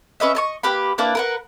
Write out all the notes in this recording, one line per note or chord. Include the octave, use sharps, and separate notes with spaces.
C#4 B4 D#5 E5
D#5 A5 C#6
A#3 G4 B4 B5
A#3 D4 E4 B4
A#4 B4 F#5